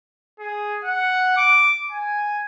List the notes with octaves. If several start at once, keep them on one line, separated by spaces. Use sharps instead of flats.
G#4
F#5
D6
G#5